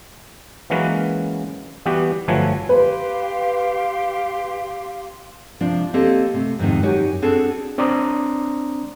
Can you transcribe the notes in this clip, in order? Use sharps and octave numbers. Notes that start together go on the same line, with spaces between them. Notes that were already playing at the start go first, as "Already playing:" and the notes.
E3 F#3 G#3 A#3 C#4 B4
E3 G3 B3 F#4 G4
G1 F3 F#3 A3 B4 G#5
G4 B4 F5 C6
C3 F3 D4
A#3 C4 G4 A4 D#5
C3 A3
F2 G#2 C3 D#3
F#2 D#4 F#4 G4 C#5 G#5
C4 D4 F#4 G#4 A4
C4 D4 D5 A#5 C6 D#6